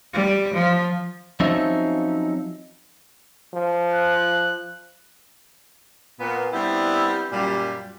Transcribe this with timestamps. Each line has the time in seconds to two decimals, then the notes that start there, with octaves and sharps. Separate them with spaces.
0.14 G3
0.54 F3
1.40 F3 F#3 C4 C#4 D#4 E5
3.54 F3
3.94 F#6
6.20 A#2 B3
6.53 G3 B3 C4 D4 E4
7.32 F#2 A#2 G3